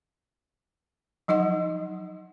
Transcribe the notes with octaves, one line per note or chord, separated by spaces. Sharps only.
F3 F#3 D#4 D#5 F#5